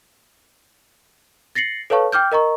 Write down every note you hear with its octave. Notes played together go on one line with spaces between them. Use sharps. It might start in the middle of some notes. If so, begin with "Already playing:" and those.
A6 A#6 C7 C#7 F#7
A4 B4 C#5 F5 A5 C#6
G5 D6 F6 G6
A#4 D#5 A#5 C#6